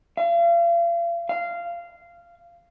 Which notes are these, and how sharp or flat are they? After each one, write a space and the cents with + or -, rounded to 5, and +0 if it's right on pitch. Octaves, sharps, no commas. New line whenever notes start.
F5 -40
F5 -15